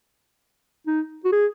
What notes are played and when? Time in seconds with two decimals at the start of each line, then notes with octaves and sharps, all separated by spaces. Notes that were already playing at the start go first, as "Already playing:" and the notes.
0.87 D#4
1.25 F#4
1.32 G#4